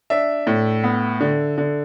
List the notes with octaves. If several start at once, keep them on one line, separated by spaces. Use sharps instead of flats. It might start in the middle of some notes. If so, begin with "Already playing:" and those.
D4 E5
A2
B3
D3
D3